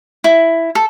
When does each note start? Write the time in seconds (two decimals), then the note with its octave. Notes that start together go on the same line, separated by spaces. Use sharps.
0.24 E4
0.75 A4